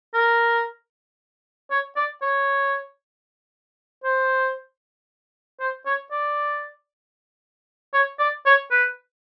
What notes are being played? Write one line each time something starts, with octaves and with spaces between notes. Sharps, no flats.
A#4
C#5
D5
C#5
C5
C5
C#5
D5
C#5
D5
C#5
B4